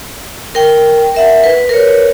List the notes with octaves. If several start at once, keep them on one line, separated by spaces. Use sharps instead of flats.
A#4 G5
A#4 E5 F#5
B4
A#4 B4 C#5